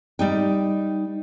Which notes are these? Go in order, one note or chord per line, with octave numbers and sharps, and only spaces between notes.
G3 D#4 G5